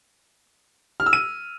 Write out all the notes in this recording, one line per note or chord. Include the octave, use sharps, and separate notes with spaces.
F6
E6
D#7